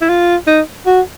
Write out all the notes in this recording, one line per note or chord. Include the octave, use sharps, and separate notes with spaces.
E4
F4
D#4
F#4